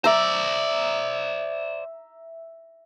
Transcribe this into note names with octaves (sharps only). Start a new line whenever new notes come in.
C5 D5 E5 A#5